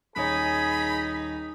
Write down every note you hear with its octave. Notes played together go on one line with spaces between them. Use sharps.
D#1 D#4 G#4 C#5 B5